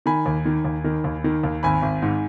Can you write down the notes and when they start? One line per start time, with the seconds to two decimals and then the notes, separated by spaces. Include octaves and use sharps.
0.06 D#3 G#5 B5
0.26 D#2
0.45 D#3
0.65 D#2
0.84 D#3
1.04 D#2
1.24 D#3
1.43 D#2
1.63 G#1 G#5 B5
1.83 G#1
2.02 G#2